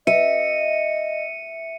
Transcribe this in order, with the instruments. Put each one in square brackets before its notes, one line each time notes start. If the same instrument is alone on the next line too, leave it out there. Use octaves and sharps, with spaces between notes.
[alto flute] D#5 [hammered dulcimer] E5 [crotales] C#7 D#7